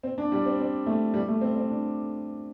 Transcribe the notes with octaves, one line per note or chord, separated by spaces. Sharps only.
C4
D4
G3
C4
C4
A3
G3
A3
C4
C4
D4